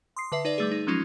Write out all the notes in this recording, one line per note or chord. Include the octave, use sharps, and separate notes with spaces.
C6 D#6 C7
D3 B4 E5 C7
D#4 B4 D5
G3 A3 G#4
D#4
F3 F#3 G#3 C#4 D#4 F4